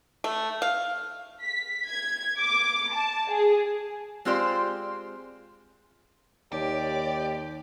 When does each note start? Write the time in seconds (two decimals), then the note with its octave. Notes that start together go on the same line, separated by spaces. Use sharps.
0.24 A3
0.62 F5
1.42 B6
1.88 G#6
2.39 D6
2.93 A5
3.31 G#4
4.25 G#3 C4 F4 G4 C5 D5
6.53 D#2 G4 C#5 D5